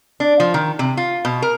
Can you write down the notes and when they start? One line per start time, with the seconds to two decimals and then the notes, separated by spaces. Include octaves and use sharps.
0.20 D4
0.40 F3
0.54 D#3
0.79 C3
0.97 F4
1.25 B2
1.42 A#4